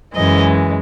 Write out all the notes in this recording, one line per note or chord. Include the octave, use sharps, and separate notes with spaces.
F#2 E3 G#3 D#5